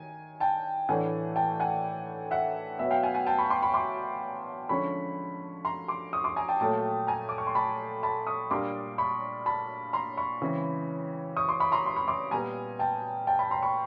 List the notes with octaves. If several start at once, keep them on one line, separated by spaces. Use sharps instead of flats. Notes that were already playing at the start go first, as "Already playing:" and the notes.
Already playing: D#3 G#5
G5 A5
A2 E3 A3 D4 F#5 G#5
G5 A5
F#5 G#5
E5 F#5
B2 F#3 B3 E5 F#5
F5 G5
F#5 G#5
F#5 G#5
G5 A5
B5 C#6
C6 D6
B5 C#6
C6 D6
D3 F3 G#3 C#4 B5 C#6
A#5 C6
C6 D6
C#6 D#6
C6 D6
G#5 A#5
G5 A5
A#2 F#3 A3 G5 A5
G#5 A#5
D6
C#6
C6
A5 B5
A5 B5
C#6 D#6
A#2 G3 A#3 D4 C6 D6
B5 C#6
A5 B5
A#5 C6
B5 C#6
C#3 E3 G#3 C4
C#6 D#6
C6 D6
B5 C#6
A#5 C6
C6
B5 C#6
C6 D6
A#2 G3 B3 G#5 A#5
G5 A5
G5 A5
A5 B5
A#5 C6
B5 C#6